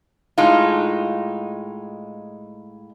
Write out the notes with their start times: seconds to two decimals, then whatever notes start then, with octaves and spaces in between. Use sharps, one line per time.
0.38 A2 G#3 D#4 F4